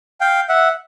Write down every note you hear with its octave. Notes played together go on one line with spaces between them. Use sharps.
F5 G5
E5 F#5